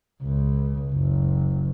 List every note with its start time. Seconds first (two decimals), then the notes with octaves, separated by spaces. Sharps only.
0.23 C#2
0.93 F#1